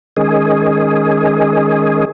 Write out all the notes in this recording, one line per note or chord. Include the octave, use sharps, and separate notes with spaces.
D#3 G#3 C#4 G#4